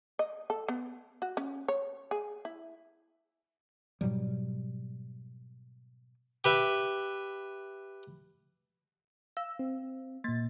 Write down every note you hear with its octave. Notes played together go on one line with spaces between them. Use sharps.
D#5
A4
B3
F#4
C#4
C#5
G#4
E4
G#2 B2 F#3 G3
G4 B4 E5
F5 E6
C4
A#2 A#3 A6